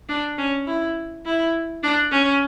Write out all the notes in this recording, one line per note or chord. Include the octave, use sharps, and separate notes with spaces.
D4
C#4
E4
E4
D4
C#4